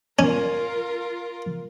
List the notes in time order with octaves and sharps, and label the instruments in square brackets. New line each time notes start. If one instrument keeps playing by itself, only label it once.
[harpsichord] C#4 [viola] F4 A#4